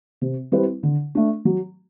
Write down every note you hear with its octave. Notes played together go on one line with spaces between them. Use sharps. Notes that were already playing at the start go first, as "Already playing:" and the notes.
C3
G3 C4 E4 B4
D3
A3 D4
F#3